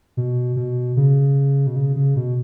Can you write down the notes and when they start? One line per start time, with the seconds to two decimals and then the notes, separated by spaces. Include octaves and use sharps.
0.17 B2
0.56 B2
0.97 C#3
1.67 B2
1.76 C#3
1.96 C#3
2.16 B2